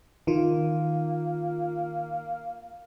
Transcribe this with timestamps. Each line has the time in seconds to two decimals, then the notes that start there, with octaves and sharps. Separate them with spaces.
0.27 D#3 A#3 F4